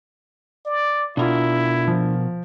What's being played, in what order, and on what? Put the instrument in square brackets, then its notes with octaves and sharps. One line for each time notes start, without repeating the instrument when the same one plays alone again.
[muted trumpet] D5
[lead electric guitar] B2 A#4 [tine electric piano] D4 F4 [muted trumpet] E4
[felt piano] F3